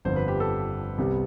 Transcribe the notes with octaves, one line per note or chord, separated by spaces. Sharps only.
G1 F2 D3 F3 B3 C5
B4
G4
A4
C2 C3 G3 B3